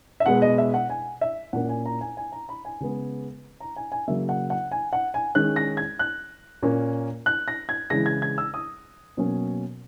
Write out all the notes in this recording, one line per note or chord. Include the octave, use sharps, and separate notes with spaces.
E5
B2 G#3 B3 F#5
D#5
E5
F#5
G#5
E5
A#2 A#3 C#4 F#5
G#5
A#5
G#5
G#5
A#5
B5
G#5
C#3 G#3 B3
A#5
G#5
G#5
C#3 F#3 A#3 E5
F#5
F#5
G#5
F#5
G#5
D#3 G#3 C#4 F#6
A#6
G#6
F#6
A#2 A#3 C#4
F#6
A#6
G#6
C#3 E3 G#3 A#6
G#6
G#6
E6
D#6
B2 F#3 A#3 C#4